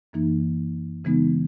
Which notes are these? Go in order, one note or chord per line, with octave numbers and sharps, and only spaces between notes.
F#2 E3 A#3 D#4
C#3 E3 G#3 B3 D#4